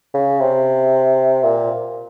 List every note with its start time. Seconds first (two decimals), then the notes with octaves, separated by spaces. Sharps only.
0.14 C#3
0.40 C3
1.43 A#2